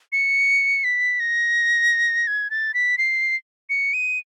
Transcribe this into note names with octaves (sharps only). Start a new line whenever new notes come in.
C#7
B6
A#6
G#6
A6
B6
C7
C#7
D#7